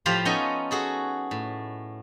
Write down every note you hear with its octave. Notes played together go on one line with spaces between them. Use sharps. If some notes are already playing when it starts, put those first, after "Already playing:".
A2 F3 F4 G4 F5 B5
B3 C#4 D#4 A4 D#5 G#5
F#4 G#4 A4
A2